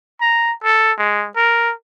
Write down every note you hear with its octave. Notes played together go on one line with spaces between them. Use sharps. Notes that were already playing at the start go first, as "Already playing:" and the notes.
A#5
A4
G#3
A#4